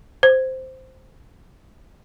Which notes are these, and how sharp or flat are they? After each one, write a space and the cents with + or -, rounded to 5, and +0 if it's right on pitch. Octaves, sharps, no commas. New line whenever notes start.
C5 -5